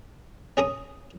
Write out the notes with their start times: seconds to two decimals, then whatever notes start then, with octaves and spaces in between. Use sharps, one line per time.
0.57 C#4 G#4 A#5 D#6